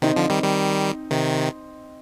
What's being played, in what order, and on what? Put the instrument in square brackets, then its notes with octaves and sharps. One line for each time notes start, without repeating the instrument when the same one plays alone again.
[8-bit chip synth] C3 D#3 [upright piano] C4 D#4
[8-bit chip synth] D3 F3
D#3 G3
D#3 G3
C3 D#3